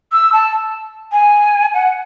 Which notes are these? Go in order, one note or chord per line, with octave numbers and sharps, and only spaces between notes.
E6
A5
G#5
F#5